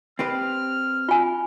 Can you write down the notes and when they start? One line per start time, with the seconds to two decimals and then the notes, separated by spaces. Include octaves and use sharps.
0.19 C4 G4 B4 F6
1.09 F4 G#5